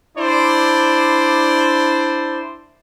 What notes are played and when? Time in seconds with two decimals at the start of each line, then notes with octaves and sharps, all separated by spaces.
0.18 D4 E4 C5 D5